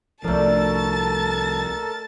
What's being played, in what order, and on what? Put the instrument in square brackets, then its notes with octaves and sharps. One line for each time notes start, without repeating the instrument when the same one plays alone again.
[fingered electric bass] C2 F3 [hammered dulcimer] A3 D4 [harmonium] A4 A#4 [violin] A5 A6